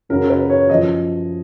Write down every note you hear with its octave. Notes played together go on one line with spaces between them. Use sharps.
F#2 C#3 F#3 A#4
B4
C#5
F#2 F3 D#5